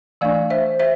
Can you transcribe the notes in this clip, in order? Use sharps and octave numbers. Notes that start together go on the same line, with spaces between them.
E3 A3 D4 D5 F5
C5 E5
C5 E5